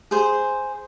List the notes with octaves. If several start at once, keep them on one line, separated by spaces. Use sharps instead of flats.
G#4 C5